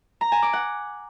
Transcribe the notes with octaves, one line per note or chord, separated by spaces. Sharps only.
A#5
G#5
D6
F#5